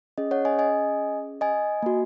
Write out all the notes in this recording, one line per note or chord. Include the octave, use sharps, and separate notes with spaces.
C#4 G#4 D#5
C#5 F#5
D#5 G#5
D#5 G#5
D#5 G#5
A#3 F#4